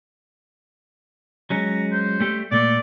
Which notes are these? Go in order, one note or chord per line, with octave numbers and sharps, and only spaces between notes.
F#3 G#3 C#4 A#5
C5
G3 A3 G4
A#2 A3 D5